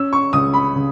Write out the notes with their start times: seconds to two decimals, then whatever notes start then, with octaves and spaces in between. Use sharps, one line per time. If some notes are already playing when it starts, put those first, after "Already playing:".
Already playing: C#4 E6
0.13 C#6
0.33 C#2 D#6
0.54 B5
0.76 C#3